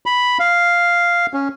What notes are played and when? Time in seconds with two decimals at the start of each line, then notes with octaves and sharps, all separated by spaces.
0.06 B5
0.40 F5
1.34 C#4